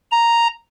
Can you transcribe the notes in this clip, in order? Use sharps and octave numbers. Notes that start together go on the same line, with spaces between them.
A#5